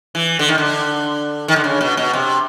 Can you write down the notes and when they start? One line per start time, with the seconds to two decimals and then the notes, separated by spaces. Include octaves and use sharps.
0.15 E3
0.39 D3
0.49 D#3
0.58 D3
1.48 D#3
1.56 D3
1.64 C#3
1.81 B2
1.97 B2
2.13 C3